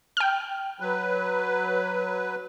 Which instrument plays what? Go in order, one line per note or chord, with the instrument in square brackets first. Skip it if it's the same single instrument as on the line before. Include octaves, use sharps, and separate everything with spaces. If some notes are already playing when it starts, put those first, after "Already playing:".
[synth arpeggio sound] G5 F6
[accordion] F#3 B4